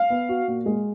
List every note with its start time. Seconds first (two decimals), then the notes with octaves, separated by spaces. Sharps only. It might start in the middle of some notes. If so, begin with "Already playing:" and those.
Already playing: F5
0.10 B3
0.29 F#4
0.48 A#2
0.66 G#3